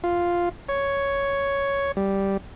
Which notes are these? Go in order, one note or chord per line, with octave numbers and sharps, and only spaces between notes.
F4
C#5
G3